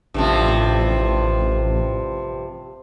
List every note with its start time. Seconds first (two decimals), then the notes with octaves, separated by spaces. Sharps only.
0.14 A1 G2 C3 F3